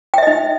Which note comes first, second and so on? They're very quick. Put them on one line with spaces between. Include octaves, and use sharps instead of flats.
G5 E5 D#5 D#4